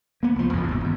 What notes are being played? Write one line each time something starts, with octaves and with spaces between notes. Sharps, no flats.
A#3 B3
C2 F3
A1 F2 A#2 A#3
G1 E2 C3
G#1 F#2